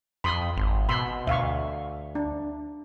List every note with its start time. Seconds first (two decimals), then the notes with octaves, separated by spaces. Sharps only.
0.24 F2 B5 C6 D#6
0.57 G#1
0.89 B2 B5 C6 E6
1.27 D2 E5 F5 C#6
2.15 D4